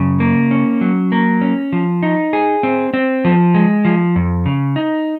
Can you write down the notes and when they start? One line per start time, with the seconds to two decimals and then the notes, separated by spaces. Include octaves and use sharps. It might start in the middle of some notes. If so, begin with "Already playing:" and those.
Already playing: F#2 C#3
0.20 A#3
0.51 C#4
0.81 F#3
1.12 A#3
1.41 C#4
1.73 F3
2.03 D#4
2.33 G#4
2.63 C4
2.94 C4
3.25 F3
3.55 G#3
3.85 F3
4.16 F2
4.46 C#3
4.76 D#4